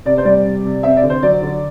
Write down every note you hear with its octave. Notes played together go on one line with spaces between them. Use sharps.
C3 D5
C5
G3 D5
C3
C3
C4 E5
D5
D3
C5
F#3 D5
D3